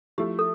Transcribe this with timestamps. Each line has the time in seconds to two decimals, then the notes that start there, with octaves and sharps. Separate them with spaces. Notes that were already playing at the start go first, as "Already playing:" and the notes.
0.18 F3 A3 E4 G4
0.39 A4